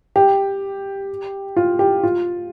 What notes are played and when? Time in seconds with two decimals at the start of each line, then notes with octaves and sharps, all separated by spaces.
0.16 G4
1.56 F4
1.79 G4
2.03 F4